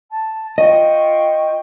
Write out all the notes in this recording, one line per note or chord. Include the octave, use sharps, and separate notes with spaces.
A5
F4 D#5 G5 C#6